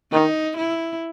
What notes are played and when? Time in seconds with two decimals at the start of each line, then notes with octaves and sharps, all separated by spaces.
0.12 D#3 D#4
0.57 E4